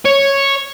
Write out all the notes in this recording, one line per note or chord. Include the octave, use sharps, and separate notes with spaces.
C#5